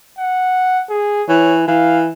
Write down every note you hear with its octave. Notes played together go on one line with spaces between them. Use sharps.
F#5
G#4
E3 C#5
E3 F5